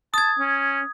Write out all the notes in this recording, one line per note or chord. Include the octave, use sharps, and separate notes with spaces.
A5 D#6 G#6
C#4